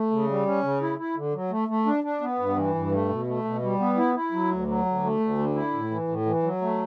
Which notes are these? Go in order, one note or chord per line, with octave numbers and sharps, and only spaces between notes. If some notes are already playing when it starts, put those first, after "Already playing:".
Already playing: A3
C#3
G3
C#4
C#3
E4
E4
D3
F#3
A3
A3
D4
D4
B3
G2
E3
G2
A3
B2
A3
B2
G3
B3
E4
E4
F#3
D2
F#3
D2
A3
D2
D3
E4
A2
E3
A2
E3
F#3
A3